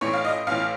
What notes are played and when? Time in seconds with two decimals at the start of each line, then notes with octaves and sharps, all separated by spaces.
0.01 A1 A2 C#5
0.13 F5
0.25 D#5
0.47 A1 A2 F5